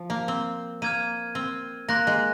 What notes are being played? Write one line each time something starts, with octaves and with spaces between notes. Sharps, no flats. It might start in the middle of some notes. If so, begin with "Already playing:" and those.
Already playing: F3
A#3
C4
A#3 F6 G#6 D#7
C4
A#3 C6 F#6 A#6
G#3